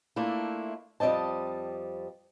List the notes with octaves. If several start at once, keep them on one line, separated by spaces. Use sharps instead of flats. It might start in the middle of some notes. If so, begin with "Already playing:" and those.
A3 A#3 D4 E4 F4
F2 G3 C4 D#5 A5